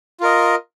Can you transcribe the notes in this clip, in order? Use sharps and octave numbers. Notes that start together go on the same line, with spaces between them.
F4 A#4 D#5